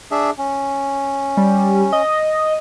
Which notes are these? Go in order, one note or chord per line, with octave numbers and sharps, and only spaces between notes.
D4 G#4 E5
C#4
G3
D#5